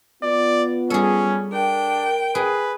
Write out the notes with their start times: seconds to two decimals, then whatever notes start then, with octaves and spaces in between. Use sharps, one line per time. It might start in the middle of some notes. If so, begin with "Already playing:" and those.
0.23 B3 F4 D5
0.90 G3 C#4 G#4 A4
1.53 D4 A#4 G5
2.35 G#4 B4